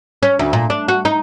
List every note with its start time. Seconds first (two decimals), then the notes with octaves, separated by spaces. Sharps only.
0.23 C#4
0.39 D2
0.53 A#2
0.70 D4
0.88 F#4
1.05 D#4